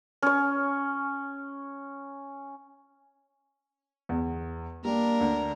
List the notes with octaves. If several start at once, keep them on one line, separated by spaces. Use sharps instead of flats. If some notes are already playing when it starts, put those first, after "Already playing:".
C#4 C#5
E2
G3 A#3 D4 A#4
D2